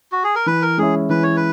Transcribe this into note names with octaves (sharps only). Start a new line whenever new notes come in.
F#4
G#4
A#4
E3 B4
A#4
G#3 C#4 E4 G#4
E3 B4
C#5
B4